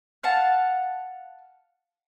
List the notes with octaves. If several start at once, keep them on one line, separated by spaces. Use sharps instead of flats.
F5 F#5 A5